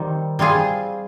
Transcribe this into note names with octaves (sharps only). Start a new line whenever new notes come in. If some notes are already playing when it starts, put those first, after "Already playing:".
Already playing: D#3 G3 C4
G3 C4 F4 G#4